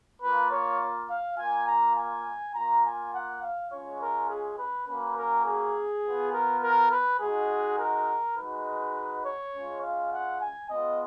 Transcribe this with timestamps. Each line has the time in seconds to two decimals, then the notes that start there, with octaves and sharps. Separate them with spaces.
0.23 A#3 F4 B4
0.52 C#5
1.10 F5
1.38 A#3 F4 G#5
1.68 A#5
1.97 G#5
2.55 A#3 F4 A#5
2.85 G#5
3.14 F#5
3.43 F5
3.72 G#3 C#4 F4 C#5
4.01 A#4
4.30 G#4
4.59 B4
4.88 A#3 C#4 F#4 B4
5.17 A#4
5.47 G#4
6.04 B3 F4
6.33 A#4
6.63 A#4
6.91 B4
7.20 G#3 D#4 F#4 G#4
7.79 A#4
8.37 G#3 D#4 F#4 B4
9.25 C#5
9.54 G#3 C#4 F4
9.83 F5
10.12 F#5
10.41 G#5
10.71 G#3 B3 F4 D#5